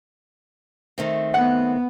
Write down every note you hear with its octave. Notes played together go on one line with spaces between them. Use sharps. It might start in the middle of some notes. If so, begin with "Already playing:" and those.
D#3 A3 C4
B3 F#5